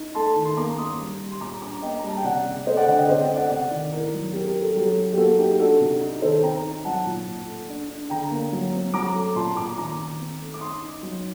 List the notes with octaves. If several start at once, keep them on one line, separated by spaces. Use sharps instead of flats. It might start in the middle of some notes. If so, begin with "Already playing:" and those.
Already playing: D#4
A3 A5 C6
D#3
C6
A#3 A#5 D6
A#3 C6 D#6
G3
G3
C6
A#2 A#5 D6
D4 A#5 D6
A#3 D#5 G5
A#5
G3 A5
G5
C3 D5 F#5
C3
A3 C5 D#5
D5 F#5
D3 D5 F#5
D#5 G5
C4 C5 D#5
D#5 G5
A3
D5 F#5
C3 D5 F#5
D#3
A2 A#4 D5
F#3
C4 G4 A#4
G4 A#4
D#4
A4
F#3 G4
F#4 A4
F#3
G4
A#3 F#4 A4
D#4 G4
D4 F#4 A4
C3
D#4
D#3 A4 C5
C4 G5 A#5
D#4
F#3 F#5 A5
A#2
A#2
A3
D4
D4
D3 G5 A#5
A#3
F#3
C4
F#3 A#5 D6
A3
A#2 A5 C6
A#2 A#5 D6
D#3 A#5 D6
D#3
C4
A3
D6
D#4 C6 D#6
D#4
F#3